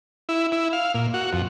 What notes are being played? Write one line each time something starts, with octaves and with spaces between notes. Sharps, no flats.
E4
E4
F5
A#2
F#4
F2